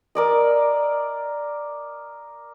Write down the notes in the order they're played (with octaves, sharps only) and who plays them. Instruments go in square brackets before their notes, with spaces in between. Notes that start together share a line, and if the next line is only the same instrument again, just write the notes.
[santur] A#4 D5 D#5